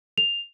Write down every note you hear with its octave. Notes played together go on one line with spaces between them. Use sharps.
F7